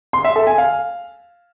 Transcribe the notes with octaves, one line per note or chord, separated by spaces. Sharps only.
C6
E5
A4
G#5
F5